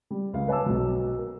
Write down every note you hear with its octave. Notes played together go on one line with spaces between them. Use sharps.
G3
C#2 F5
B4 C#5 G#5 A5 D6 E6
B1 F#3
A#4